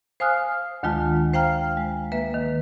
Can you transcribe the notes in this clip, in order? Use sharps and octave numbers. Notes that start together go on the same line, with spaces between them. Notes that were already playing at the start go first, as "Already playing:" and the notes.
C5 F5 G#5 D#6 F6 F#6
D2 D#3 G#3 F4 A5
C5 F5 G5 A#5 F6
G#3
A#3 B4 E5
D#3